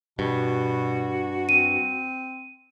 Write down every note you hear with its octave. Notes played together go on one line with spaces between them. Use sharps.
G2 B2 F#4
C4 D#7